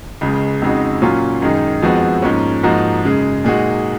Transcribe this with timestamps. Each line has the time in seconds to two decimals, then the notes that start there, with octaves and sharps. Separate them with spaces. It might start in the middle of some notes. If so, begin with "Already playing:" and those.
0.21 C#2 C#3 G#3
0.62 F2 C#3 G#3 D#4 F#4
1.02 A#2 F#3 C#4 F4
1.42 F#2 D#3 G#3 D#4
1.82 F2 F3 G#3 B3 F#4
2.22 G#2 F3 A#3 C#4
2.63 G#2 F3 A#3 D#4 F#4
3.03 F#2 C#3 G#3
3.44 A#2 G#3 D#4 F#4